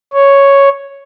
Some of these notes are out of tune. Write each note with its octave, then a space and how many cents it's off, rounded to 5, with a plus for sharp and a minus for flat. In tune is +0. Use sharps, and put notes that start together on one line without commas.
C#5 +0